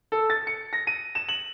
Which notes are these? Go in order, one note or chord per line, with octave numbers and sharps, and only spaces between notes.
A4
A6
C#7
A#6
D#7
E7
F#7